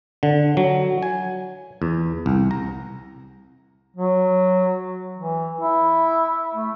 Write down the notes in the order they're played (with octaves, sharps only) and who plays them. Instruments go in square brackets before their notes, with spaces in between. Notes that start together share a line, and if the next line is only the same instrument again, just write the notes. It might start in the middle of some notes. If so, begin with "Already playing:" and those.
[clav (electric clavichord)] D3
F#3
G#5
E2
C2
A#5
[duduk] F#3
E3
E4
A3